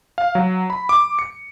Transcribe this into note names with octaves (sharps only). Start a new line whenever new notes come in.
F5
F#3
B5
D6
C#7